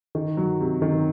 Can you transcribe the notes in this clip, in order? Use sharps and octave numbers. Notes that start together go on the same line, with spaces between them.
D#3
F#3
C3
D#3